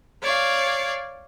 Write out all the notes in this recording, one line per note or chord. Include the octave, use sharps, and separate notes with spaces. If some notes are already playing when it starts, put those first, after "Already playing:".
C#5 D5 F5